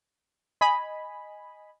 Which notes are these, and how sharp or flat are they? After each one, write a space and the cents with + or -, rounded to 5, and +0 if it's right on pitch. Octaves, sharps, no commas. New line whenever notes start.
D#5 +0 G#5 +0 B5 +0